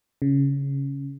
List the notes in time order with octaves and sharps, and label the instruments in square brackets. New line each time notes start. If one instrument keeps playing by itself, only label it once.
[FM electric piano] C#3